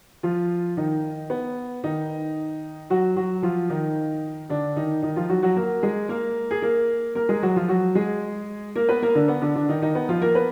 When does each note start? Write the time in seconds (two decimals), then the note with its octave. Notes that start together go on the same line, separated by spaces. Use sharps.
0.23 F3 F4
0.77 D#3 D#4
1.30 B3
1.84 D#3 D#4
2.90 F#3 F#4
3.16 F#3 F#4
3.43 F3 F4
3.70 D#3 D#4
4.50 D3 D4
4.76 D#3 D#4
5.02 D#3 D#4
5.16 F3 F4
5.29 F#3 F#4
5.43 F#3 F#4
5.56 A#3 A#4
5.82 G#3 G#4
6.09 A#3 A#4
6.51 G#4
6.62 A#3 A#4
7.15 A#3 A#4
7.29 G#3 G#4
7.43 F#3 F#4
7.56 F3 F4
7.69 F#3 F#4
7.95 G#3 G#4
8.75 A#3 A#4
8.89 B3 B4
9.02 A#3 A#4
9.15 D3 D4
9.28 B3
9.42 D3 D4
9.56 D3 D4
9.69 D#3 D#4
9.81 D#3 D#4
9.95 B3
10.09 F3 F4
10.22 A#3 A#4
10.35 B3 B4